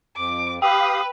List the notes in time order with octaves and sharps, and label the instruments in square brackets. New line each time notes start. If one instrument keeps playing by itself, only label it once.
[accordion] F2 [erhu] D6
[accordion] G4 F5 D#6 [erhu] B4 [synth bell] G5